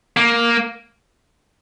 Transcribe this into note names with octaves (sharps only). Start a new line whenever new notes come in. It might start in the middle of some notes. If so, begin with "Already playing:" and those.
A#3